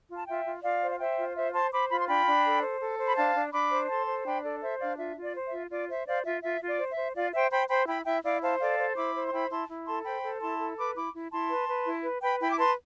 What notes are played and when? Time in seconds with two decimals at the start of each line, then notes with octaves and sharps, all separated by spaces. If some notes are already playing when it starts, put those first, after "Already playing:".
0.10 F4
0.17 A5
0.27 F4 E5 G5
0.45 F4
0.63 F4 D5 F5
0.82 C5
0.92 F5
0.99 C5 E5 G5
1.18 F4
1.35 C5 E5
1.54 C5 A5 C6
1.72 C5 B5 D6
1.91 F4 B5
1.99 C6
2.08 D4 G5 B5
2.26 D4
2.45 A4
2.63 C5
2.81 A4
2.99 C5
3.08 B5
3.17 D4 F5 A5
3.35 D4
3.53 D4 B5 D6
3.71 C5
3.89 A4 A5 C6
4.08 C5
4.25 D4 G5 B5
4.43 A4 D5
4.62 C5 E5
4.80 D4 D5 F5
4.98 F4 E5
5.16 F4
5.22 D5
5.34 C5
5.46 E5
5.52 F4
5.71 F4 D5
5.89 C5 E5
6.07 C5 D5 F5
6.25 F4 E5
6.43 F4 E5
6.61 F4
6.67 D5
6.79 C5
6.91 E5
6.97 C5
7.15 F4 D5 F5
7.33 C5 E5 G5
7.51 C5 G5 B5
7.70 C5 G5 B5
7.87 E4 G5 B5
8.06 E4 E5 G5
8.24 E4 D5 F5
8.42 C5 F5 A5
8.60 A4 D5 F5
8.78 C5
8.96 E4 B5 D6
9.15 C5
9.28 C6
9.33 E4 G5 B5
9.51 E4 A5 C6
9.69 E4
9.87 A4 A5 C6
10.05 C5 G5 B5
10.23 A4
10.41 E4 A5 C6
10.60 A4
10.78 B4 B5 D6
10.96 E4 B5 D6
11.14 E4
11.32 E4 A5 C6
11.50 B4
11.68 B4
11.86 E4
12.04 B4
12.22 B4 G5 B5
12.40 E4 G5 B5
12.51 D6
12.59 B4 A5 C6